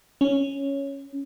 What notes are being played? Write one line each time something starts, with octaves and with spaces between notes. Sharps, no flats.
C#4